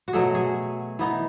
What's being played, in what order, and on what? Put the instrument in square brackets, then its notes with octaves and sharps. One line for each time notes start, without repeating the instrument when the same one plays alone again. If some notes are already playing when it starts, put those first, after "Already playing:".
[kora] F#4
B2 F#3 A3 G#4
G#4
E3 B3 D#4